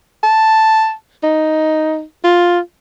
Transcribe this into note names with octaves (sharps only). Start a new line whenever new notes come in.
A5
D#4
F4